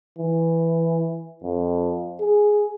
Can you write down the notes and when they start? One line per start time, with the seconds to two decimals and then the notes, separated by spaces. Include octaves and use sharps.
0.19 E3
1.43 F2
2.21 G#4